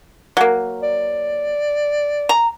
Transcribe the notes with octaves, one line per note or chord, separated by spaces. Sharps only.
F#3 A#3
D5
A#5